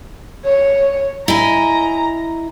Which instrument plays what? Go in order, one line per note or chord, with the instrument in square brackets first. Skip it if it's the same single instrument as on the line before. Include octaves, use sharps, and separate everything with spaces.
[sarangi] C#5
[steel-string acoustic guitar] E4 D#5 G#5 [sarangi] A#5